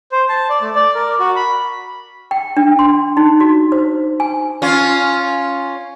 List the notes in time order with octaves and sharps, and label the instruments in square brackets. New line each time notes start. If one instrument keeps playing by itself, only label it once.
[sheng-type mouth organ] C5
A5
D5
A3
D5
A#4
F#4
B5
[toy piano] G5
D4
C6
D#4
F#4
C5
G#5
[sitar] C#4 F4